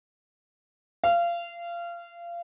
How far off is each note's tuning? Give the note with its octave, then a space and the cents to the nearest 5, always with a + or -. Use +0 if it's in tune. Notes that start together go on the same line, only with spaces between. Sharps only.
F5 -25